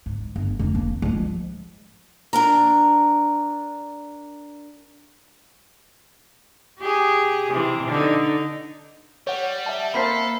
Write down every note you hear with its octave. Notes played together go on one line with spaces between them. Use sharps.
G#2
G1
F1 F#2
A#3
F3 G#3
D4 A#4 A#5
G4 G#4
C3 E3
D3 D#4
G3 C#5 F#5
E5 F#5 A5
A#3 A4 C5 B5 B6 C7